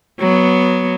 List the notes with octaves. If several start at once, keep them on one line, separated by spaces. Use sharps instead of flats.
F#3 B3